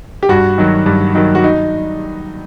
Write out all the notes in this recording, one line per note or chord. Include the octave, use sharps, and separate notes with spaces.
G4
G2 F#4
D#3 F#3
G2
D#3 F#3
F#4
D#4